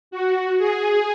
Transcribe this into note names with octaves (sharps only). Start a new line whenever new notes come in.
F#4
G#4